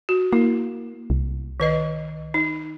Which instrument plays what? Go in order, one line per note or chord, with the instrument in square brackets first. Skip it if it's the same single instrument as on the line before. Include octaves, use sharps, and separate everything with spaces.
[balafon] F#4
[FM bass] A#3 [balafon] E4
[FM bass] C2
[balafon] D#3 B4 D#5
D#4